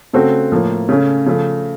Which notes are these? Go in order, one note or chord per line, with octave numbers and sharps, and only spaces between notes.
C#3 A3 C4 F#4 A4
A2 F3 A#3
C#3 A3 C#4
C#3 F3 A3